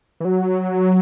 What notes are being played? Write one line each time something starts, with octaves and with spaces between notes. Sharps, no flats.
E3
F#3